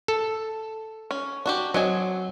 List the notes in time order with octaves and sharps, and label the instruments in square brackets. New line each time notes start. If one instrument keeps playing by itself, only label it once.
[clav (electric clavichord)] A4
[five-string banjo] C#4
D4 F#4 G4
[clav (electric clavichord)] F#3 [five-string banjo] C4 D#5 G#5